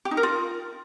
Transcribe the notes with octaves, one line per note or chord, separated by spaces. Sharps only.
G4
D#4
A#4
F4